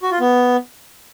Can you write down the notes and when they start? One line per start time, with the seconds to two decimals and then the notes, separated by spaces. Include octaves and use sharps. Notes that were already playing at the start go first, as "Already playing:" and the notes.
0.03 F#4
0.11 F4
0.20 B3